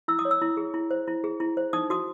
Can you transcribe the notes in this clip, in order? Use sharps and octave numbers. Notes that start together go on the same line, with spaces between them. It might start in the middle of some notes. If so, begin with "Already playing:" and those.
E4 E6
D#6
C#5
E6
E4
G#4
E4
C5
E4
G#4
E4
C5
D#4 D#6
F#4 D#6